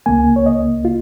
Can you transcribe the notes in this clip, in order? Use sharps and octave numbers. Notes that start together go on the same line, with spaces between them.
C#2 C#3 A#3 G#5
C#5
D#5
F4